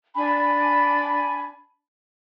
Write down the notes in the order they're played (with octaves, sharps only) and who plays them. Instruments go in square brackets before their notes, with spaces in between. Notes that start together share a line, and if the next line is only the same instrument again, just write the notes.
[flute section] D4 G#5 B5